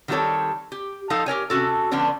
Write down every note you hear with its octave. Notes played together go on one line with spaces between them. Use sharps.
D#3 G3 C4 F#4 A4 C#5
G4
F3 D#4 A4 F5
G4 A#4 C#5 G#5
C3 C#4 F#4 A4
D3 F3 B3 C#4 D4